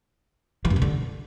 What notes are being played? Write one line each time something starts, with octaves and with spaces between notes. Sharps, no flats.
E3
F#2
B2
D3